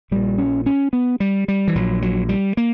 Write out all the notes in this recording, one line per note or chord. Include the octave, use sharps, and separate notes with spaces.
A#1 A#2 G3
C#4
C#4
B3
G3
G3
E3
A#1 A#2 F#3
F#3
G3
A#3